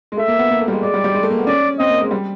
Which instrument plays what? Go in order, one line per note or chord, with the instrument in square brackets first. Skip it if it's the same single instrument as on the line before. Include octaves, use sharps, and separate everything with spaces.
[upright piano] G#3
[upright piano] A3 [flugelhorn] E5
[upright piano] A#3
B3
A#3
A3
G3
G#3
[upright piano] G#3 [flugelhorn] D5
[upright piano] G3
G3
G#3
A3
A#3
B3
[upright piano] C#4 [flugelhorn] D5
[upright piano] C4 [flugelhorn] D#5
[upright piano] A#3
G#3
G3